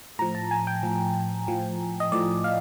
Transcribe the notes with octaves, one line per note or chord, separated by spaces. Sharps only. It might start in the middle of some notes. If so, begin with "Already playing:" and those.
A2 F3 A#5
A5
G#5
G5
A2 F3
A2 F3
D#5
A2 F3 D5
F5